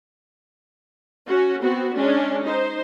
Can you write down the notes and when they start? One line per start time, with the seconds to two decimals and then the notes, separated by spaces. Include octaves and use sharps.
1.27 C#4 F#4
1.62 B3 C4 F#4
1.95 G#3 C#4 D4
2.44 D#4 C5